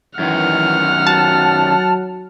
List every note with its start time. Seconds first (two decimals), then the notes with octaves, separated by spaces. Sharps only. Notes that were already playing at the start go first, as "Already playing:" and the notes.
0.19 F#2 D#3 E3 F#5 F6
1.07 F#3 A5